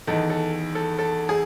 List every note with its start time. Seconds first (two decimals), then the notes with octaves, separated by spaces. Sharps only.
0.07 E2 D#3 A4
0.30 A4
0.75 A4
0.99 A4
1.29 G#4